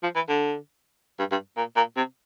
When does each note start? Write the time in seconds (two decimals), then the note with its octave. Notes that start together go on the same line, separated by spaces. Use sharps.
0.03 F3
0.15 E3
0.28 D3
1.19 G2
1.31 G2
1.57 A#2
1.76 A#2
1.96 C3